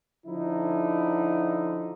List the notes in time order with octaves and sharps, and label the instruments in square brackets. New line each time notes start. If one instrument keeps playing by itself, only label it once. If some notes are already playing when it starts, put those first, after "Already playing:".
[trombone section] D3 F3 D#4 E4